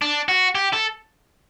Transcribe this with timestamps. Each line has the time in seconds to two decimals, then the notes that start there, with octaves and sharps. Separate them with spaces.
0.02 D4
0.28 F#4
0.55 G4
0.73 A4